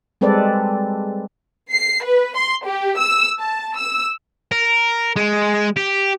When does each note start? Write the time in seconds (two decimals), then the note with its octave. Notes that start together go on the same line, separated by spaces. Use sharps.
0.21 G3 G#3 C4 A4 B4 D5
1.70 C7
2.03 B4
2.36 C6
2.65 G4
2.98 E6
3.41 A5
3.77 E6
4.51 A#4
5.16 G#3
5.77 G4